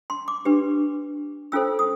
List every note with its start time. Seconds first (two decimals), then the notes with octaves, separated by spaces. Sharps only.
0.10 C6
0.28 D6
0.45 D4 G4 B4
1.52 C#4 F4 A4 C5 E6
1.79 D#6